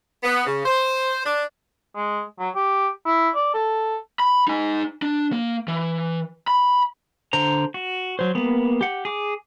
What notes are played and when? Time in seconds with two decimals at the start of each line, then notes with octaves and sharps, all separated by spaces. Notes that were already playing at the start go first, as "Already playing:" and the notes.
0.23 B3
0.44 C#3
0.64 C5
1.23 D4
1.95 G#3
2.39 F#3
2.55 G4
3.06 E4
3.35 D5
3.54 A4
4.19 B5
4.48 D#4 G#5
5.02 D4
5.32 A#3
5.68 E3
6.48 B5
7.33 D3 C5 A#5
7.74 F#4
8.19 F#3 C5
8.35 G3 A#3 B3
8.81 G4 F#5
9.05 G#4 D6